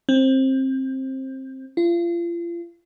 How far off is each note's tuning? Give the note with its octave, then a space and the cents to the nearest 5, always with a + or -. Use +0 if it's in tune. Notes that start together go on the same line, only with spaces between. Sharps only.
C4 +20
F4 -35